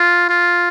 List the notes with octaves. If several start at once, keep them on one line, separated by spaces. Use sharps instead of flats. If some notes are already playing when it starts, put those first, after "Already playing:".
Already playing: F4
F4